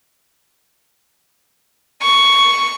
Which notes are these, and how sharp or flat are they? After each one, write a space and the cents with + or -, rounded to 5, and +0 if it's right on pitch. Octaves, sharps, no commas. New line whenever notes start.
C#6 +5